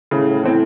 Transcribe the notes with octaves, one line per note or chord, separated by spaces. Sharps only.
A2 C#3
E3 C4